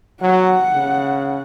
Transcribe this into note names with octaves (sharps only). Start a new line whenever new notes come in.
F#3 F#5
C#3